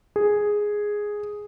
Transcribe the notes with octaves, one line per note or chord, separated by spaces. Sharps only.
G#4